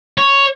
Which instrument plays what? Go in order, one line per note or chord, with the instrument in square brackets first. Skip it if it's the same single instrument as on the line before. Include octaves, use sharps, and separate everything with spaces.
[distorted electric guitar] C#5